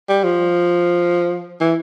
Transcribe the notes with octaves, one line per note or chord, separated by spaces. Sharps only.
G3
F3
E3